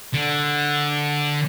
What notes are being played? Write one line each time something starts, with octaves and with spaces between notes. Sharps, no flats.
D3